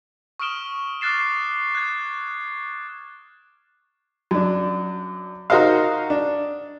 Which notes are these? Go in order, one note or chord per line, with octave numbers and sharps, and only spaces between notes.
C#6 D#6 F6 D7 E7 G7
D6 F6 F#6 A6 C7 E7
F#6 G#6
F#2 D4
D#4 F#4 A#4 C5 D#5 F5
D4